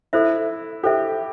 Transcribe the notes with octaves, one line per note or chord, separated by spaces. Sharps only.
E4 A4 C5 E5
G4 A4 C5 E5